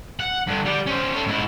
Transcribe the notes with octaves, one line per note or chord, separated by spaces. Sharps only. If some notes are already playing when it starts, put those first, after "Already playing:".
F#5
G2 D3
G3 D5
C#4 C5
A4 C#5
G#2 E4